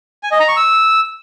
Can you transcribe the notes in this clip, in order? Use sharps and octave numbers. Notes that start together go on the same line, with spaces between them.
G#5
D#5
A#5
C#6
E6